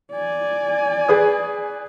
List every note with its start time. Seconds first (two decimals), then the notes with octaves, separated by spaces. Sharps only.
0.12 D5 G#5
1.08 G#4 B4 D#6